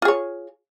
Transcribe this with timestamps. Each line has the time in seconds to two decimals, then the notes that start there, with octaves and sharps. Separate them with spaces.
0.02 F4
0.05 G#4
0.08 C#5